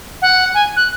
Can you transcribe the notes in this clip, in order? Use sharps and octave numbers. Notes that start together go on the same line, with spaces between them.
F#5
G#5
F#6